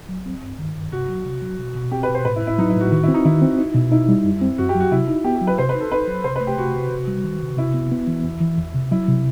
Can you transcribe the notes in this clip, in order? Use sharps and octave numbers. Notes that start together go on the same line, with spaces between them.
F#3
C4
G2
D#3
G2
C3 F#4
F#3
C3
F#3
B2
B2
C4 G4
B4
B2
C5
A2 B4
E4
A2
E4
F#3 D#4
E4
A2 F#4
D#3 F#4
C4 E4
D#4
D#3 E4
C4
D#4
B2
D#4 E4
G3
F#2
C4
F#2 F#4
G4
F#3
F#4
C3 E4
D#4
B3 G4
G4
F#3
B4
C3 C5
B4
D#4
A4
D#4 B4
F#3
C3 C5
B4
A3
G4
C3 F#4
C3
C3
G3
D#3
C3
C3 E4
B3
B3
E3
E2
E3
E2
C3
F#3 E4
C3